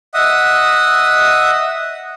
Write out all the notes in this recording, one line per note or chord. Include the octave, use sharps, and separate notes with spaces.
D#5 E5 F#5 D#6